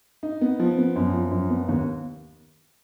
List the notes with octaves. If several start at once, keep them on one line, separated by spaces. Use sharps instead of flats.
D#4
B3
F3
B3
F#2
F3
F#2
B3
D#2